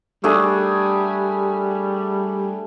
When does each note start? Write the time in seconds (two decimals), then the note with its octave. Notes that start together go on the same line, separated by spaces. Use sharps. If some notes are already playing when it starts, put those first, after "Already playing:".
0.24 G3 A3 D4 G#4